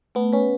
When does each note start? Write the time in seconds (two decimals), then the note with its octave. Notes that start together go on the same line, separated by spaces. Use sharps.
0.15 A3 B3
0.33 C#4 B4